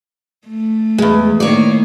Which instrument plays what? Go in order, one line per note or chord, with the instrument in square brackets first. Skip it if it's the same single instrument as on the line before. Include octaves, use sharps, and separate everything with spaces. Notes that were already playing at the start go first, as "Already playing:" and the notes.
[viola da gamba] A3
[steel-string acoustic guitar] E2 G#3
[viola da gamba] A2 D#3 A#3 [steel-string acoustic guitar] C#5 D5